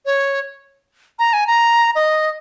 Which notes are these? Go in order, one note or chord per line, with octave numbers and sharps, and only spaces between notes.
C#5
A#5
G#5
A#5
D#5